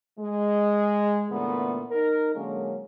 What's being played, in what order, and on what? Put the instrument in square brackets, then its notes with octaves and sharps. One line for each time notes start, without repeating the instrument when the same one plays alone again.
[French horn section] G#3
A#2 D3 E3 A3 B3
D#4 A#4
D3 F#3 G#3 A#3 C#4